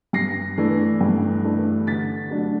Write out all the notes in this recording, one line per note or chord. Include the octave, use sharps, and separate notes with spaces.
G2 A#6 C7
E3 A3 D4
G2
E3 A3 D4
D3 A6 B6
F#3 A3 D4